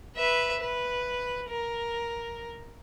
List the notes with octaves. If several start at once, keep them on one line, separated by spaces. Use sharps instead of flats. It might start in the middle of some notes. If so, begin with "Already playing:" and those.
B4 E5
B4
A#4